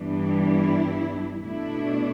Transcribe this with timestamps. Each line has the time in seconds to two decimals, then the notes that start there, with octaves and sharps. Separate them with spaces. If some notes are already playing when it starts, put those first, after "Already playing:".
Already playing: G2 E3 G3 B3 D4
0.29 E4
1.42 B2 A3 D4 E4